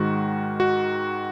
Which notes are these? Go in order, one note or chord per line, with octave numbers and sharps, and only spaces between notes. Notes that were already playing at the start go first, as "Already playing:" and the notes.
Already playing: G#2 D#3 G#3 F#4
F#4